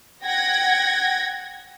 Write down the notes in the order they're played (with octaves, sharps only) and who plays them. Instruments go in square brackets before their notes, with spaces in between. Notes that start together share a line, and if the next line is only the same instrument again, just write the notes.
[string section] F#5 G5 G#6 A#6